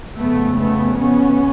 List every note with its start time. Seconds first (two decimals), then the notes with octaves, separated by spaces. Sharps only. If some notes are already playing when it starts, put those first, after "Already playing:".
0.17 F2 C#3 A3 B3
0.58 A3 B3
0.99 B3 C#4